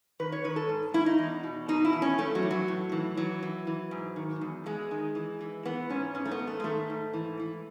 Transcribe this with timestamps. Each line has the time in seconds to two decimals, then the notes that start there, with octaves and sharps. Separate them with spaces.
0.20 D#3 B4
0.32 C#5
0.44 D#3 B4
0.56 A4
0.69 G#2
0.94 G#2 E4
1.06 D#4
1.19 E2
1.43 B2
1.68 B2 D#4
1.85 E4
1.93 E2
2.02 C#4
2.18 A2 A3
2.35 F#3
2.42 E3
2.51 F#3
2.68 A2
2.92 E3
3.17 E3 F#3
3.43 E3
3.67 E3
3.91 G#2
4.16 D#3
4.41 E2
4.66 E2 G#3
4.91 D#3
5.15 E3
5.41 E3
5.65 E3 B3
5.89 G#2 C#4
6.15 G#2 C#4
6.26 A3
6.31 B3
6.39 G#2
6.47 A3
6.60 G#3
6.64 D#3 A3
6.90 G#2
7.14 E3
7.39 E3